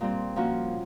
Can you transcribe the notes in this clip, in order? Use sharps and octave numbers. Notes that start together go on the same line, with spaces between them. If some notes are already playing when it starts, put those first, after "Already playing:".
A#2 G3 C4
F3 A#3 C#4 F#4